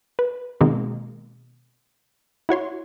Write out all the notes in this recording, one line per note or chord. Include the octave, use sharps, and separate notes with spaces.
B4
B2 D#3 G#3 A#3 C4
E4 F#4 C#5 C6